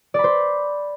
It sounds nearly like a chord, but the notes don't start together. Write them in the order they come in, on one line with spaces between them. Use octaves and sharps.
D5 B5 C5